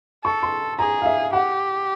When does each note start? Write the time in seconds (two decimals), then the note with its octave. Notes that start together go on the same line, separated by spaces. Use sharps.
0.24 A4 C#6
0.43 C6
0.79 G#4 A#5
1.02 F5
1.06 E5
1.33 G4 F#5